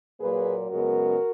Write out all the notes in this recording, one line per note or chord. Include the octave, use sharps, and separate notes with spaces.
A#2 F#3 A#3 G#4 B4
F#2 C#3 G#3 B3 F#4 A#4